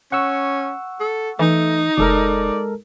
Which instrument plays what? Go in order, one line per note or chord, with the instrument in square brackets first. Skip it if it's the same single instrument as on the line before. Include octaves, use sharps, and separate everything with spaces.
[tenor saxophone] C#4 [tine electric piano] F#5 C#6 E6
[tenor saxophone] A4
[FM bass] E3 [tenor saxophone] A3 [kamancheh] D#4
[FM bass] F1 [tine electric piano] G#3 A4 A#4 [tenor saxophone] D5